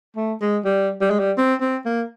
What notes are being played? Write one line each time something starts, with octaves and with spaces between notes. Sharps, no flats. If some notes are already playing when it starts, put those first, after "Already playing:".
A3
G#3
G3
G3
G#3
G3
C4
C4
A#3